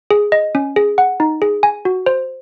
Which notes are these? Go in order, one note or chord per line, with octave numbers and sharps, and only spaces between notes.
G#4
D#5
C#4
G#4
F#5
D#4
G#4
G#5
F#4
C5